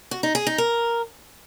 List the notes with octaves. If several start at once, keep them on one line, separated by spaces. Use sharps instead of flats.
F#4
D#4
G#4
D#4
A#4